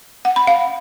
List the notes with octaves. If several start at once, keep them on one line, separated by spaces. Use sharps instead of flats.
F#5
B5
F5